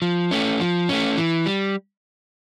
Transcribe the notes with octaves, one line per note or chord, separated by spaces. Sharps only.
F3
A3 C#4
F3
A3 C#4
E3
G3